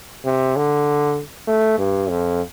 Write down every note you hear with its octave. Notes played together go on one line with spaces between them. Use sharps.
C3
D3
A3
G2
F2